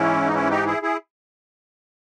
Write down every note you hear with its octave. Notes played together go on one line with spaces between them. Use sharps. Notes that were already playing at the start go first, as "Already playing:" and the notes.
Already playing: G#2 E3 C#4 E4
D#4
C#4 E4
D#4 G4
E4 G#4
E4 G#4